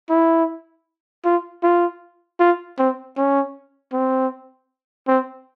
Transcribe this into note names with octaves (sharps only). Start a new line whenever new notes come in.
E4
F4
F4
F4
C4
C#4
C4
C4